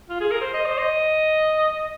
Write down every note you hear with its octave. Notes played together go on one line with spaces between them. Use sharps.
F4
G#4
A#4
C5
D#5
C5
D#5